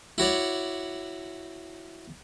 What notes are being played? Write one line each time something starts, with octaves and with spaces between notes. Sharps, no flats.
E4 F#4 C#5 D5